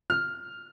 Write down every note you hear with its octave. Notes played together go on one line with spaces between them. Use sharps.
F6